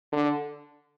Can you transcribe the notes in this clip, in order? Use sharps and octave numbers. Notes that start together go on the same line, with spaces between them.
D3